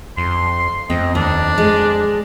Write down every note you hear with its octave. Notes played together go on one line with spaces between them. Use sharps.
F2 C6
F2 C4 D#5
D#2 D4
G#3